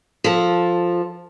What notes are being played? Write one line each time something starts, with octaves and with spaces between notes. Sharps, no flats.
F3 A4